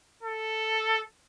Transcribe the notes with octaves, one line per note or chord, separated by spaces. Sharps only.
A4